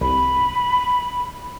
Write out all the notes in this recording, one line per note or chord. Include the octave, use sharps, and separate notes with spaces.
C2 B5